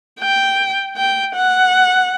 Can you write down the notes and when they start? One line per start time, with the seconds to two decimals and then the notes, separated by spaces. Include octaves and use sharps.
0.20 G5
0.97 G5
1.35 F#5